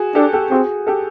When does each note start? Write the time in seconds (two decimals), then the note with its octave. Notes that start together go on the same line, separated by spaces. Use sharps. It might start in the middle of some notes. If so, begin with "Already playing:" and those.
Already playing: F#4 G#4
0.15 D4 G4 A4
0.33 G4 A4
0.51 C4 F#4 G#4
0.87 G4 A4